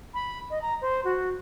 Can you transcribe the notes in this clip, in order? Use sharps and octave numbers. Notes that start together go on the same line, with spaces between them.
B5
D#5
A#5
C5
F#4